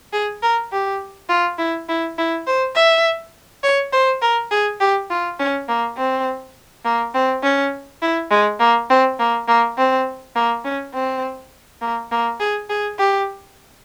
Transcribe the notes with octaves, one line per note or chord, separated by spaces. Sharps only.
G#4
A#4
G4
F4
E4
E4
E4
C5
E5
C#5
C5
A#4
G#4
G4
F4
C#4
A#3
C4
A#3
C4
C#4
E4
G#3
A#3
C4
A#3
A#3
C4
A#3
C#4
C4
A#3
A#3
G#4
G#4
G4